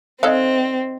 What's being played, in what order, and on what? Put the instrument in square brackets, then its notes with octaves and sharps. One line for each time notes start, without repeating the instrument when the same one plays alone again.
[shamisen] D#3 A4 F5 [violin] C4 [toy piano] C5 D5 D#5